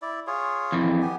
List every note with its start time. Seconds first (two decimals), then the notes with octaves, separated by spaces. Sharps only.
0.02 E4 D5
0.27 F4 G#4 C#5
0.72 F2 E3
1.02 B3 G4 G#5